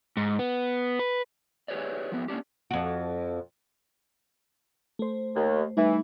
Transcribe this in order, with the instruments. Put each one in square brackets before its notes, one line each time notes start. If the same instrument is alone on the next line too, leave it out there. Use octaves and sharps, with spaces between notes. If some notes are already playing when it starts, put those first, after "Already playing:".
[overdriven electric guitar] G#2
B3
B4
[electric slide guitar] G4 G#4 B4 C#5 D5
F3 F#3 B3
A#3 C#4 D4 G4
[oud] F2 F#4
[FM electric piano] A3 C5
[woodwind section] D#2
[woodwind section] E3 [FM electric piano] G3 A3 D#4